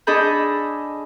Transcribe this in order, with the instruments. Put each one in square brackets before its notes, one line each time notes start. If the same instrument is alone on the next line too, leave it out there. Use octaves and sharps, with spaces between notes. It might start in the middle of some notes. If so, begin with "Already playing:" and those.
[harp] D4 G#4 A4 D#5 B5 G6